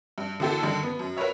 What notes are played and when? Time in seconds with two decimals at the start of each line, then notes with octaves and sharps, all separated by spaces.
0.18 G2
0.40 D3 E3 A#3 F#4 G4 A4
0.63 G2 D3 D#3
0.83 B3
0.99 F#2
1.17 F#4 A#4 B4 C#5 E5